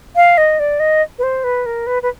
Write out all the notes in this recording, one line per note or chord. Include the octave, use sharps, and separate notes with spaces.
F5
D#5
D5
D#5
B4
C5
B4
A#4
B4
B4